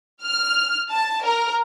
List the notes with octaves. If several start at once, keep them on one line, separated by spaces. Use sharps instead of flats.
F6
A5
A#4